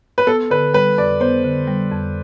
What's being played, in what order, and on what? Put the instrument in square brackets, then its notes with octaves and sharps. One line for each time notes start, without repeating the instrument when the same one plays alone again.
[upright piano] B4
[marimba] B3 [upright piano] A4
[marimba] D3 [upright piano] B4
[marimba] G3 [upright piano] B4
[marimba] F2 [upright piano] D5
[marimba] B3 [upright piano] C5
[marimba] D3
G3
F2